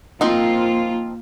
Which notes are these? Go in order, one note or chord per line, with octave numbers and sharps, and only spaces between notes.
F3 A#3 C4 D#4 F4